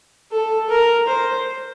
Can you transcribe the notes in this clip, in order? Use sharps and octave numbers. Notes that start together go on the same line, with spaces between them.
A4
A#4
C5